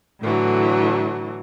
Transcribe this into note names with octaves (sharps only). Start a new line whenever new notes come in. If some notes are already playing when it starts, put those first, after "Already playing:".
A2 D3 E3 F#3